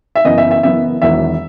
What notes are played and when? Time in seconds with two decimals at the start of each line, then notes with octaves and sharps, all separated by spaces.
0.16 E5
0.25 F#1 F#2 E3 B3 D#5
0.38 E5
0.51 E5
0.63 F#1 F#2 E3 B3 E5
1.02 E1 E2 D#3 F#3 E5